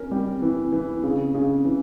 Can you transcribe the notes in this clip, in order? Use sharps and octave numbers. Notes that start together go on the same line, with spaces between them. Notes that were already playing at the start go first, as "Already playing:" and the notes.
Already playing: C#4 A#4
G3
E3
E3
C#3
C#3
E3